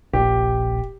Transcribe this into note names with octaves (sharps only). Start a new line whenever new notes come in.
E1 A#1 G4